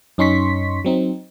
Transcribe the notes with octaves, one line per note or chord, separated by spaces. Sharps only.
F#2 C#4 D#4 C6 C#6 B6
F#3 C4 D#4